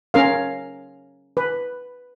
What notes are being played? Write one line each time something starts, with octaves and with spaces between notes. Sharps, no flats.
C#4 A#4 F5
B4